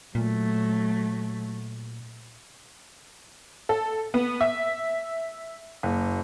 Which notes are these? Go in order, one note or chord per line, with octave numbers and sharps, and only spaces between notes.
A#2 F#3 A3
A4
B3
E5
F#1